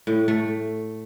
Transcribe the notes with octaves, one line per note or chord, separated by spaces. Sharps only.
A2
A3